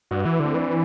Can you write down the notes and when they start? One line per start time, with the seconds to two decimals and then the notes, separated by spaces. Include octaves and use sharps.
0.11 G2 F#4
0.25 E3
0.34 E4
0.40 D3 C4
0.55 E3 D4